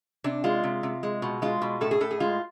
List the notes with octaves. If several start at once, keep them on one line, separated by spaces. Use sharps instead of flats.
C3 D4
G#3 F4
C3
C3
G#3
B2
G#3 F4
B2
A2 A4
G#4
A2 A4
G#4
G#3 F4